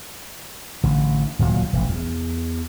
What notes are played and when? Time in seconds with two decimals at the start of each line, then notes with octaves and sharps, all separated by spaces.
0.83 A1 D3
1.39 D#1 D2 A#2 F#3
1.73 E1 A1
1.89 E2